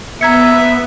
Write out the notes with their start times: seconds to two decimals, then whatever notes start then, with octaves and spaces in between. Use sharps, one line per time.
0.21 B3 E5 A#5 G#6 C#7